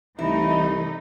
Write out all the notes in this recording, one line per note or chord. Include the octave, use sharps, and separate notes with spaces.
C2 E3 A3 D#4 E4